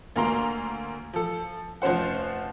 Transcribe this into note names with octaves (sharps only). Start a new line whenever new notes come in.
D2 A#3 A#5 C6
F3 A4
F1 F3 C#4 C5 F#5